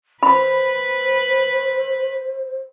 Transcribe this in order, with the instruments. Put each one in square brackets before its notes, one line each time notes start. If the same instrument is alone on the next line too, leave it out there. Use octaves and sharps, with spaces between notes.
[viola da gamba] B4 [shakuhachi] C5 [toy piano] B5